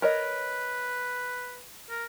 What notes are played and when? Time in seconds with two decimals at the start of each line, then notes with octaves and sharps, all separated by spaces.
0.02 A#4 B4 C#5 D#5
1.90 A#4